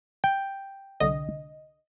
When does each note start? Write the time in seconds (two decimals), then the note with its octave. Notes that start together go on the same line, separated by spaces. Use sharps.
0.24 G5
1.00 C2 D3 D#5